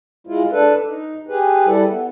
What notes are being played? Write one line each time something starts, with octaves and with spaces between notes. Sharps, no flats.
G#3 E4 F4
D4 A4 B4
D#4
G4 G#4 B4
G3 E4 A4
B3